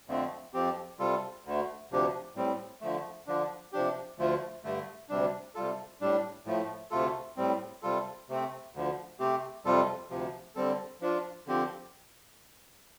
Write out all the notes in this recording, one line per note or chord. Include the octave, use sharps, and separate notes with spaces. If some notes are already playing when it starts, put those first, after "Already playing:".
F2 D3 F3 A3 C4
F2 F3 C4 G4
C3 G3 F4 A4
D2 D3 A3
D2 C3 F3 D4 G4
A2 G3 C4
D3 F3 A3
D3 F3 D4
C3 F3 D4 G4
D2 D3 F3 A3 F4
G2 D3 A3
D2 C3 G3 D4
C3 G3 F4 A4
A2 G3 D4
A2 F3 A3
D2 C3 A3 F4 A4
A2 G3 C4
C3 G3 F4 A4
C3 A3 C4
D2 D3 F3
C3 A3 C4 G4
F2 C3 G3 F4 A4
D2 C3 F3
D3 G3 C4 A4
F3 D4 F4
D3 F3 C4 G4